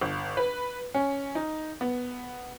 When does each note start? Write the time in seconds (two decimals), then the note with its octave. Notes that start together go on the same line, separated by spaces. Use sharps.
0.01 G1
0.37 B4
0.94 C#4
1.35 D#4
1.81 B3